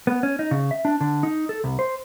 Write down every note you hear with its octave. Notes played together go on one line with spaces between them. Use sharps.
B3
C#4
D#4
C#3
E5
D4
D3
D#4
A4
C2
C5